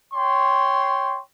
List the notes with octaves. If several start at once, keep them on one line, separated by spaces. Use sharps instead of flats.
C#5 G5 C6